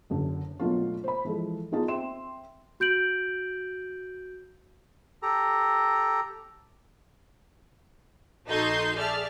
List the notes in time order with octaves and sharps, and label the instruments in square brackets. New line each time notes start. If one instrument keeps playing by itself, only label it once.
[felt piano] F#1 F#2 D3
B2 F#3 A3 A#3 D4 F4
C5 B5
E3 F3 G#3 A4
A#3 B3 D#4 F4 G#4 A5
C4 E5 C6 E7
[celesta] F#4 G6 D7 F#7
[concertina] G4 A4 A#5
[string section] A#1 D#4 F#4 A4 C6 G6
G#4 D5 E5 A5 F6